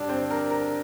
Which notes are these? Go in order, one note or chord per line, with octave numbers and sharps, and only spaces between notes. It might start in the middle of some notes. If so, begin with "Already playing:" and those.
Already playing: G2 D3 G3 D4 D5
C4 C5
A#4
A#4